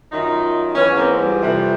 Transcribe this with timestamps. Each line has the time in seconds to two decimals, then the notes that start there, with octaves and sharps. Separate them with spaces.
0.12 F#2 D#3 D#4 F4
0.75 G#2 E3 B3 C#4
0.96 A#3 C4
1.18 F3 G3
1.40 F2 C3 E3